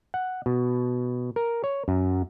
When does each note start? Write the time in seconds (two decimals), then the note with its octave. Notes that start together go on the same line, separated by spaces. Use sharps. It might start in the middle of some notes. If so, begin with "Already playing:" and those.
0.14 F#5
0.46 B2
1.36 A#4
1.64 C#5
1.88 F#2